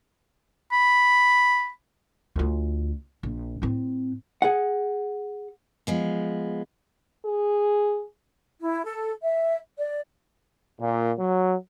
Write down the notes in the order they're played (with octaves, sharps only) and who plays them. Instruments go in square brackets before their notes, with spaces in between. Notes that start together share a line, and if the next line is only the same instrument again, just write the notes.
[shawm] B5
[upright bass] D2 F4
A#1
A2 C4
[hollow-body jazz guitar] G#4 F#5
[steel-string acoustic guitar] F3 G#3 B3
[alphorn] G#4
[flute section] E4
A4
E5
D5
[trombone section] A#2
F#3